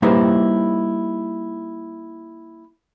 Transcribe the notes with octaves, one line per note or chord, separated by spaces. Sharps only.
G3 A#3 D#4 E4 B4 C5